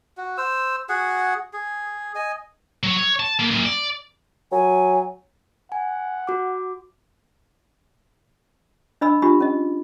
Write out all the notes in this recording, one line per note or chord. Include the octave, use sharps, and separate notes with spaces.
F#4
C5 E6
F#4 G#4 F#5
G#4
D#5 G#5
F#3 C#5
C#5
A5
A#3 B3
F#2 A#2
D5
F#3 G#5
F#5 G#5
F#4 D6
D4 D#5 B5 E6
D4 F4 G4 B5
C#4 D#5